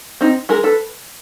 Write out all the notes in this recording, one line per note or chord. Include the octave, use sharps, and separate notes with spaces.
C4 D#4
G#3 G#4 A#4
A4 B4